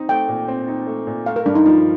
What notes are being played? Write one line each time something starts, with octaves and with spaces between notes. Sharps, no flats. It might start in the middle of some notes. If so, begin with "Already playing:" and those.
Already playing: C4 D#4
A3 G5
A#2
C4
D#4
A3
A#2
A3 F5
A#4
G2 D4
D#4
F3 D#4